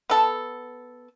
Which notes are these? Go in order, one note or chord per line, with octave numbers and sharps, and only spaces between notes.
B3 A4